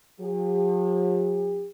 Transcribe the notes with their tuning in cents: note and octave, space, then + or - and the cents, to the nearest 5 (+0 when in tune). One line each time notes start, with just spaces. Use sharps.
F#3 -45 G4 +45